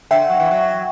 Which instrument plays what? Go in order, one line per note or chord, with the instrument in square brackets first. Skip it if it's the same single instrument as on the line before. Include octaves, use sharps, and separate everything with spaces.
[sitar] D3 [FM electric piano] E5 G5
[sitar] F#3
E3
F#3